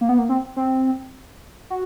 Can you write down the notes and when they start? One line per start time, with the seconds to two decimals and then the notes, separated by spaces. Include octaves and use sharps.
0.01 A#3
0.09 B3
0.18 A#3
0.29 C4
0.56 C4
1.70 F#4